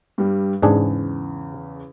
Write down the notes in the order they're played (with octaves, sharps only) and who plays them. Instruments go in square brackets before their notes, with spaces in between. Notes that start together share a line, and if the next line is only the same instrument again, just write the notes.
[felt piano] G2 G3
[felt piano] E2 C#3 [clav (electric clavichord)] G#2 D4 G#4